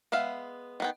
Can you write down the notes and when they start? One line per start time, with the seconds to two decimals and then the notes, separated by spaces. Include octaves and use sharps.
0.12 G#3 B3 E5 F5
0.80 D#3 B3 G5